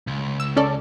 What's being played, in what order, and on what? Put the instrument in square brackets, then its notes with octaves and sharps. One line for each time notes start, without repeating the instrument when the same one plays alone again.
[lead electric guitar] C#2
[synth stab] E6
C#4 A4 D5